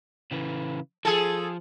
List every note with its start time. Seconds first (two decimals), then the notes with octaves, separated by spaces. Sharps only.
0.31 C#3 E3
1.05 F3 G#4 A4